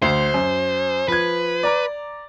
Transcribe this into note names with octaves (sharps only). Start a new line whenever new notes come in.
D2 C5
F#2
F3 B4 G#6
D5 A#5 D6